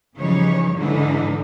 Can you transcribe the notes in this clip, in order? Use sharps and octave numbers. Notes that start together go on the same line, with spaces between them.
C#3 E3 F3 G3 D#4 C#5
G#2 D3 E3 D#4